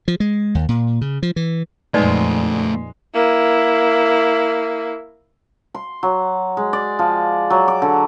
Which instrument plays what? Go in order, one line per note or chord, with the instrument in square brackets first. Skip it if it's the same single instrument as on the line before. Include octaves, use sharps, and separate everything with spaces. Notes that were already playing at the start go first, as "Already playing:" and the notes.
[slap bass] F3
G#3
D#2
A#2
C#3
F3
E3
[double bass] F2 A#2 [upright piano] G#3 [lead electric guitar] A3 C5 [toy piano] D#4 B4 D5
[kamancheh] A#3 E4
[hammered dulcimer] C6
F#3
G#3
D5
F3
F#3
D6
D3